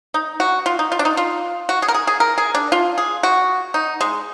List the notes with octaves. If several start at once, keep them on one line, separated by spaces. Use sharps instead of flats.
D#4
F#4
F4
D#4
F4
D4
D#4
F4
F#4
G#4
A#4
G#4
G#4
A#4
G#4
D4
F4
G#4
F#4
D#4
G#3